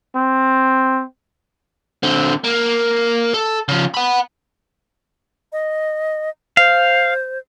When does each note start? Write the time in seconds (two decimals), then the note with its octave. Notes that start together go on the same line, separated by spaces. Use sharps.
0.16 C4
2.03 D3 C4
2.44 A#3
3.34 A4
3.69 C#3 F3
3.94 F#5 B5
5.52 D#5
6.57 C5 F5